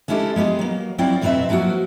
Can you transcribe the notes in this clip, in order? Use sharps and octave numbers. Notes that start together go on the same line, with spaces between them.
G#3 B3 C#4 E4 G4 A4
G#3 B3 G4 G#4
F#3 A#3
F#3 C4 E4 D5 F5
F2 B2 F#3 C4 B4 E5
F3 F#3 A#3 E4 F#4